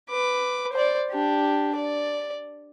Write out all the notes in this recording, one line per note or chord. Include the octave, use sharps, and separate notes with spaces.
B4 D6
C5 D5
D4 G4
D5